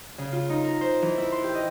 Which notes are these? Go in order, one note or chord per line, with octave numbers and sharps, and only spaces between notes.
C#3
F4
D#4
A#4
C5
E3
E4
C6
G4
D#5